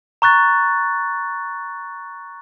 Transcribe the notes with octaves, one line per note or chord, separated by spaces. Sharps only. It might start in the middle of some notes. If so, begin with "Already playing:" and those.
A#5 C#6 F#6 A6